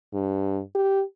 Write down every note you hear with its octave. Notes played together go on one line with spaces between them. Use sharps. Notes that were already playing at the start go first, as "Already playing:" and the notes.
G2
G4